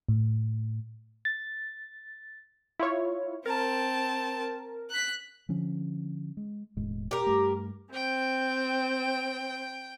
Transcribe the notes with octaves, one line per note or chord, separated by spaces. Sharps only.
A2
A6
E4 F4 C#5
C4 A#4 A5
F#6 B6
D3 F3 C#4
G#3
E1 A2 G#3
G4 A#4
G2 A3
C4 G5